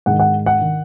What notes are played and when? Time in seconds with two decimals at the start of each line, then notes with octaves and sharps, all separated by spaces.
0.06 G#2 D#3 F#5
0.20 F#5
0.46 F#5
0.61 D#3